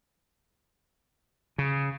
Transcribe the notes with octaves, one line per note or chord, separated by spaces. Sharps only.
C#3